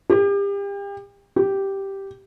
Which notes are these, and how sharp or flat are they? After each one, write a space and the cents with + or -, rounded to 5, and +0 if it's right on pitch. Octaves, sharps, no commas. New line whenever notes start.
G4 +35
G4 -5